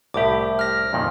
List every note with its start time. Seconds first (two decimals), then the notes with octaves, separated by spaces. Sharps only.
0.14 C2 A2 G4 E5 D6
0.59 F6 A#6
0.93 F2 A#2 D#3